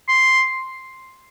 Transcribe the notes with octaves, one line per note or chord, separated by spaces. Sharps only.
C6